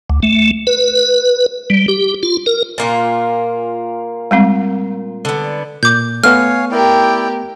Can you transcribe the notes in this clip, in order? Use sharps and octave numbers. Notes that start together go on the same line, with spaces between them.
D2
A3
B4
G3
G4
F4
A#4
A#2 A#3 F4
G3 G#3 C4
D3 B3
A#2 D6 G6
A3 B3 C#5 F5 G#5 F6
E4 G4 A#4 D5 G5